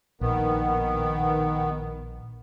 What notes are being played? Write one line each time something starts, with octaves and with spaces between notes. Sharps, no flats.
A#1 D#3 B3